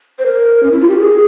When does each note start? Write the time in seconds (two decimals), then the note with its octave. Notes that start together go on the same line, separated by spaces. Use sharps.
0.19 C5
0.26 A#4
0.63 C#4
0.71 E4
0.80 F4
0.89 G4
0.98 G#4